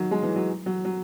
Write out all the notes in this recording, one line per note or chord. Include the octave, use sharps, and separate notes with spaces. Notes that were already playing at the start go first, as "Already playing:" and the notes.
Already playing: D#3 F#3
G#3
E3
F#3
F#3
F#3